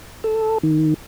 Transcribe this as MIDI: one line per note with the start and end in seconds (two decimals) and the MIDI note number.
0.24 0.58 69
0.63 0.94 51